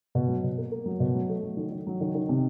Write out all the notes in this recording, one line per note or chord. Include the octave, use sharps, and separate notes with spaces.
B2
F#3
B2
A#3
A#3
F#3
B2
F#3
A3
F#3
D#3
D#3
F#3
D#3
D#3
C3